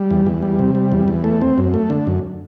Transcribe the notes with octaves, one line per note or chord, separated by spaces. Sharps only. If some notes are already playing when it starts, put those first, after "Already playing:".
Already playing: G3
E2
E2
G3
C3
G3
E2
E2
A3
C4
F#2
A3
D3
F#2